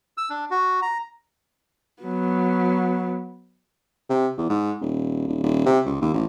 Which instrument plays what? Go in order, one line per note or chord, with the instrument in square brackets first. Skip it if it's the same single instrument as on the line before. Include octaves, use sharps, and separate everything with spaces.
[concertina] E6
D4
F#4
A#5
[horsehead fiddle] F#3 B3
[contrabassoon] C3
E2
G#2
D#1
D#1
D#1
C3
C#2
D#2
A1